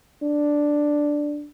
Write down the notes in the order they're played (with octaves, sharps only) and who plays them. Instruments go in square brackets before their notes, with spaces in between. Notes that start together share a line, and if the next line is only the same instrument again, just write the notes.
[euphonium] D4